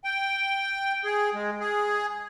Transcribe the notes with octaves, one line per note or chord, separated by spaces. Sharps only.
G5
G#4
G#3
G#4